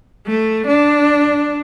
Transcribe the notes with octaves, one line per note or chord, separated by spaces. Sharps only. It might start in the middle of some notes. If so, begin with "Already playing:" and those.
A3
D4